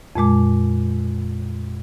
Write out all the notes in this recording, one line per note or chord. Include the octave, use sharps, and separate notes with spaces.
F2 A#2 G#3 D6